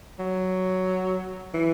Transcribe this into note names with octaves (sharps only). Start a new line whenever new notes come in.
F#3
E3